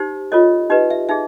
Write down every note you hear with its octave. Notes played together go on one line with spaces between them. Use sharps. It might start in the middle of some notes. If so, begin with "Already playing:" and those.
Already playing: D#4 G4 C5
F4 A4 C#5 D#5
D#4 G4 B4 D#5
E5
D#4 G#4 E5